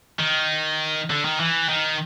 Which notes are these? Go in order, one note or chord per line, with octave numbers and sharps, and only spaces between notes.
D#3
D3
D#3
E3
D#3